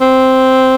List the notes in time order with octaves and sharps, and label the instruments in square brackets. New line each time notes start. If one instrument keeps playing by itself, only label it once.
[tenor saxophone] C4